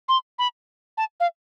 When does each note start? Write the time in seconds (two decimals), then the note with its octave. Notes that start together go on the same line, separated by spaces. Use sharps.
0.09 C6
0.39 B5
0.98 A5
1.20 F5